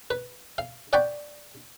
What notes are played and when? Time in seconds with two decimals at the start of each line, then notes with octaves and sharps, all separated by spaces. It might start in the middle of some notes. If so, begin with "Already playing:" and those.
0.10 B4
0.58 F5
0.93 D5 F#5 G5 B5 C#6